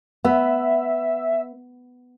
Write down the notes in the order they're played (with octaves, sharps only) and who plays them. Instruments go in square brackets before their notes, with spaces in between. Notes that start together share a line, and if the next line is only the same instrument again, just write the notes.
[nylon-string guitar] B3 [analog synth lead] E5